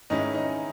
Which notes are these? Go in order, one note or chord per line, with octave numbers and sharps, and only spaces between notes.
G#2 D#3 G#3 C#4 D#4 E4 D#5
D#4 D#5